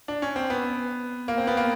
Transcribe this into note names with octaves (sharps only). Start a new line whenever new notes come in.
D4
C#4
C4
B3
A#3
C4
B3
A#3